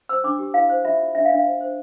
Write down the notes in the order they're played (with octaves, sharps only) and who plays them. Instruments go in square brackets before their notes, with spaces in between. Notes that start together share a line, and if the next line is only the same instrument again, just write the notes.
[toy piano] C5 E6
D4 D6
G4
E4 F5
C5
F4 E5
F4
D4 E5
F5
D4
F5
C5
C5